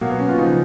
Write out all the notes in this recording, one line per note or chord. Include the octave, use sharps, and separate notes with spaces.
B2 F#3 A#3
B3
C#4
F4
C#3 F3 D#4